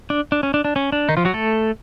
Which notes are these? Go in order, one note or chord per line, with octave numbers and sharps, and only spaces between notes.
D4
D4
C#4
D4
D4
C#4
D4
D#3 D#4
F3 F4
F#3 F#4
A3 A4